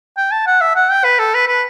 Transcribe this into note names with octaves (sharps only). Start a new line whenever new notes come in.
G5
A5
F#5
E5
F#5
G5
B4
A4
B4
B4